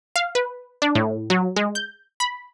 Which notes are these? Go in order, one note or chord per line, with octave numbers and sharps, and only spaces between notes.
F5
B4
D4
A2
F#3
G#3
G6
B5